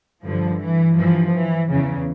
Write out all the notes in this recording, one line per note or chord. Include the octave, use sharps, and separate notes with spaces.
G2 D3 F3
E3
G2 E3 F3
E3
E2 C#3 E3